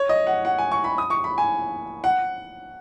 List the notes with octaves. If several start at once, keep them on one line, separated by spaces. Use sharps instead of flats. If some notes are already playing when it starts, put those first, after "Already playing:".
Already playing: C#5
D#5
F#5
F#5
G#5
C#6
B5
D#6
C#6
B5
G#5
F#5